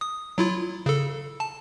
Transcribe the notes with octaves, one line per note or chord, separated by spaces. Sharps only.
D#6
F#3 E4 F4
C#3 A4
A5